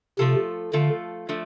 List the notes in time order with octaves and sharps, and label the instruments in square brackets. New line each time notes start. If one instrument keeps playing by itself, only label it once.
[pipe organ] C3 [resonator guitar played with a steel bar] F3 A3 F4 A4
[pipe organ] D3 [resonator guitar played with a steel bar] F3 A3 F4 A4
[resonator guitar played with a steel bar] F3 A3 D4